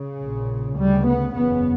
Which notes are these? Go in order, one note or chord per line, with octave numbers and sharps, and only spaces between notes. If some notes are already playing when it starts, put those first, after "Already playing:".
Already playing: C#3
A#1 A#2
D2 C#3 G3
B3
F#1 E2 C#3 B3